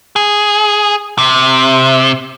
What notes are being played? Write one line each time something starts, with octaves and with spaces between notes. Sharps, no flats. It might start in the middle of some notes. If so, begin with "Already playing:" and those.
G#4
C3